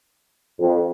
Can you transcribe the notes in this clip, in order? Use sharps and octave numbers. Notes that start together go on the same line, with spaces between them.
F2